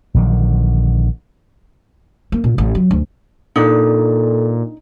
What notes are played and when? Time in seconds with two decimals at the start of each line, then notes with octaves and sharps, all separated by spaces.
0.14 A#1 D3 D#3 F#3
2.32 A#3
2.44 A#2
2.58 A1
2.75 F#3
2.91 D2
3.56 A#2 D4 D#4 A4